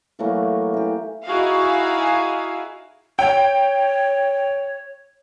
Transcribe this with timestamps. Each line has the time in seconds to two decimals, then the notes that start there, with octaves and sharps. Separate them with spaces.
0.19 E3 F#3 A3 A#3
0.74 E3 G4
1.26 D#4 E4 F#4 G#4 F5
3.19 C#5 G5